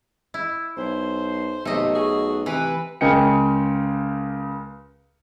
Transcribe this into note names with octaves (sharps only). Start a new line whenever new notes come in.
E4
B1 C5
B1 C3 A3 D#5
F#4 G#4
C3 E3 E4 B4
C#2 C#3 A#4 D#5 G5 C#7